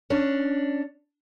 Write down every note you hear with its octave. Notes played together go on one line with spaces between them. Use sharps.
C#4 D4